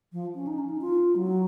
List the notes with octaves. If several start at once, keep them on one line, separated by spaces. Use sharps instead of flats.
F3
C#4
D#4
C#4
D#4
F4
F#3